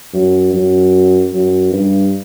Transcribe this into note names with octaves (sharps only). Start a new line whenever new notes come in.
F#2
F#2
F#2
G2